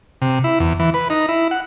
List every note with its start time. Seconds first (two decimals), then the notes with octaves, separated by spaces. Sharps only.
0.22 C3
0.44 E4
0.60 E2
0.80 E3
0.94 B4
1.10 D#4
1.29 E4
1.51 F#5